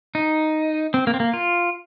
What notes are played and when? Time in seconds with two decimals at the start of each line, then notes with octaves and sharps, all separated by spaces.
0.15 D#4
0.94 C4
1.07 A#3
1.14 C4
1.20 A#3
1.34 F4